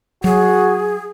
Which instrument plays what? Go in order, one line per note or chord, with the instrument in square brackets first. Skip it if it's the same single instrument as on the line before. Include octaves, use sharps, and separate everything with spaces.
[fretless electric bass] F#3 [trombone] F#4 [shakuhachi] G#4